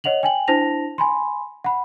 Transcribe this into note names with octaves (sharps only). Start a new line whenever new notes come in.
C#5 D#5 F#5 F7 F#7
G5 G#5 F#7
D4 E4 C5 A5 A#6 F7
G#5 B5 C6
F#5 B5